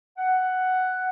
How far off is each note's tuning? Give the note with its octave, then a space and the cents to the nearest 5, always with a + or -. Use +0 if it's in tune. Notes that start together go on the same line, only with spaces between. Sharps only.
F#5 +5